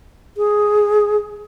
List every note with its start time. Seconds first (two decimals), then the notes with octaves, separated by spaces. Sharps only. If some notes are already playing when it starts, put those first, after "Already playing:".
0.37 G#4